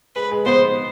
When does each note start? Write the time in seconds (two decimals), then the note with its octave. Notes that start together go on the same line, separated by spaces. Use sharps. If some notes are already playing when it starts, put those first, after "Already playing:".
0.16 G#3 B4
0.31 G#3
0.46 B3 C5